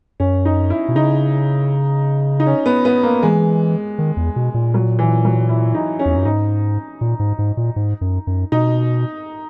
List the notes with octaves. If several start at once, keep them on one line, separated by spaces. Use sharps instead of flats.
F#2 C#4
D#4
E4
B2
C#3 D#4
D#4
C#4
B3
B3
A#3
E3 G#3
D#3
E2
B2
A#2
F#3
E3
F#3
E4
D#4
C#4
E2
F#2
G#2 D#4
A#2
G#2
G#2
A#2
G#2
F#2
F#2
B2 D#4